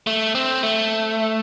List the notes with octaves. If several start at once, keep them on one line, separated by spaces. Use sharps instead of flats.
A3
C4
A3